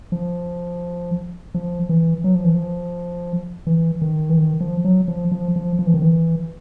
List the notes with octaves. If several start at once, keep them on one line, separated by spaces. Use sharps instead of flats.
F3
F3
E3
F#3
F3
E3
F3
E3
D#3
E3
D#3
F3
F#3
F3
F3
F3
F3
E3
D#3
E3